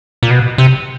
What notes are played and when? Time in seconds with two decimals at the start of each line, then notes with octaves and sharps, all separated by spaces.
0.23 A#2
0.31 B2
0.58 C3